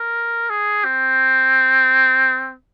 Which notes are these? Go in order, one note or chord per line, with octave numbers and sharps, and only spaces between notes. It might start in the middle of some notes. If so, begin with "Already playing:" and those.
Already playing: A#4
G#4
C4